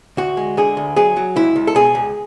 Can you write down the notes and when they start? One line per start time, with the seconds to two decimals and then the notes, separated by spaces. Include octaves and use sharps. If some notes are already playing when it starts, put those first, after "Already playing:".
0.17 D2 F#4
0.37 G#3
0.57 D3 G#4
0.77 D2
0.96 F#3 G#4
1.17 F#3
1.36 C#2 E4
1.56 C#2
1.67 A4
1.75 B2 G#4
1.95 C#2